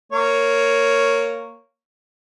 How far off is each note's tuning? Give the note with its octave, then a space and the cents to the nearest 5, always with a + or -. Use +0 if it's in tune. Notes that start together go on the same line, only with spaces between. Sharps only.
A#3 -10 C#5 +0